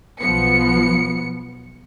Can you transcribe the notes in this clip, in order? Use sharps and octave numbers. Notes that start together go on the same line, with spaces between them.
B1 F3 B3 C#7